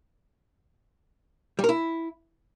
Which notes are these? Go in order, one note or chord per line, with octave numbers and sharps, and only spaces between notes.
G3
A#4
E4